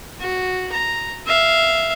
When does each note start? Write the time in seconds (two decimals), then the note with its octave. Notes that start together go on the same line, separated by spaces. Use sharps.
0.20 F#4
0.72 A#5
1.27 E5 F5